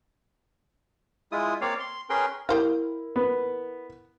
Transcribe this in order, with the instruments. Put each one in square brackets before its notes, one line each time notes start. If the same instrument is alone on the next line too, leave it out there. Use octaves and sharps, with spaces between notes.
[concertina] G#3 E4 F4 D#6
A#3 C4 C#5 D5 F5
C6
C#4 G#4 A#4 B4 G5 C6
[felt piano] E4 A#4 [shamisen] G4 C5 F5
[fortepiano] B3